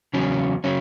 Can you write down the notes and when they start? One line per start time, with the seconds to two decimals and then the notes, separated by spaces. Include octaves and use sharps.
0.14 E2 C#3 F#3 C#4
0.64 C#3 F#3 C#4